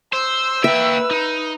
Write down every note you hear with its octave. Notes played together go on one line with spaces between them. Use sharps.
C5 E6
A#3 B4 E5 G5
D#4